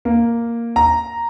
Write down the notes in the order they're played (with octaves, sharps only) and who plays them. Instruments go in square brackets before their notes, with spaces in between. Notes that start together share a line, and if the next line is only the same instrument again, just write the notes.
[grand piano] A#3
A#5